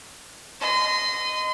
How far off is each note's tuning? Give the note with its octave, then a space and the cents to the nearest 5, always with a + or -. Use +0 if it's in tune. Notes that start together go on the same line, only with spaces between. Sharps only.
D#5 -5 C6 -35